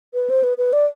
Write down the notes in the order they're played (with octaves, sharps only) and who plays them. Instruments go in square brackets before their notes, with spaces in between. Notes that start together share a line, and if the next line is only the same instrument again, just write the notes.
[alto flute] B4
C5
B4
B4
D5